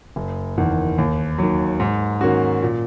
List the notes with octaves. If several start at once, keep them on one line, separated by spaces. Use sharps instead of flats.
F#1
E2 D#3
D#2
D#3 F#3
G#2
D#3 A#3 C#4 F#4
A#2